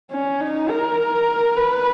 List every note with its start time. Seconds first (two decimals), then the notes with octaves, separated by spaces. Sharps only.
0.11 C#4
0.40 D#4
0.70 A#4
1.57 B4